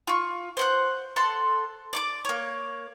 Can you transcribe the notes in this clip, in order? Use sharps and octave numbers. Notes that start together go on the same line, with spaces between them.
F4 C#6
C5 F#5 F#6
A4 F#5 C6
D5 C#6 D6
A#3 C#5